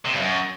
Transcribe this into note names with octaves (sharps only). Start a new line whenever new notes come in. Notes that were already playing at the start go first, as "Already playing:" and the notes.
C3
G2
F#2